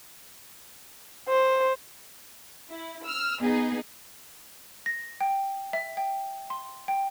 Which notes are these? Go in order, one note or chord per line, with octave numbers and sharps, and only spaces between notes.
C5
E4
E6 F6
B3 D#4 G#4
A#6
G5
E5
G5
C6
G5